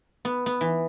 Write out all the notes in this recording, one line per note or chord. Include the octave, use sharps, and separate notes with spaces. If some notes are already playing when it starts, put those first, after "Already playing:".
B3
B3
E3